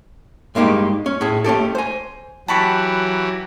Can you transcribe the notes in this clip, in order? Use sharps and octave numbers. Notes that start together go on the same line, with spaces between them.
G2 G#3 A#3 D#4 G4
C#4
A2 G#4
A3 C#4 G4 A4
C5 G#5
E3 F#3 F#4 G4 A5 B5 C#6